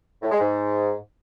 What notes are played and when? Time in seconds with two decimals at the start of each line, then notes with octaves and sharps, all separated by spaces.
0.23 A2
0.32 G#3
0.41 G#2